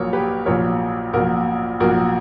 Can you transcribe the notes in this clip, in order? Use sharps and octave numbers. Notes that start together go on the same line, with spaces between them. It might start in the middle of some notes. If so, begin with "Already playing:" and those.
Already playing: A#1 A#2 F#3 A#4 C#5
G4 B4
A#1 A#2 F#3 A#4 C#5
A#1 A#2 F#3 F#4 A#4
A#1 A#2 F#3 F#4 A#4